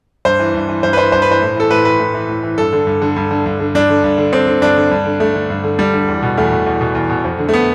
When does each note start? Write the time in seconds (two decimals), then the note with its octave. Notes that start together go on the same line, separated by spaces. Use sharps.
0.25 G2 C5
0.39 E3
0.54 G2
0.69 E3
0.83 G2 C5
0.93 B4
0.97 E3 C5
1.12 G2 C5
1.22 B4
1.27 E3 C5
1.42 A2
1.56 E3 A4
1.71 A2 B4
1.85 E3 B4
2.00 A2
2.14 E3
2.29 A2
2.43 E3
2.58 G2 A4
2.73 D3
2.87 G2
3.02 D3
3.16 G2
3.31 D3
3.46 G2
3.60 D3
3.75 G2 D4
3.90 D3
4.04 G2
4.18 D3
4.33 G2 C4
4.47 D3
4.62 G2 D4
4.77 D3
4.91 G2
5.06 D3
5.20 G2 A3
5.35 D3
5.50 G2
5.64 D3
5.79 G2 G3
5.94 D3
6.08 E2
6.23 B2
6.37 E2 A3
6.52 B2
6.66 E2
6.81 B2
6.95 E2
7.10 B2
7.24 F2
7.39 D3
7.49 A3
7.53 B3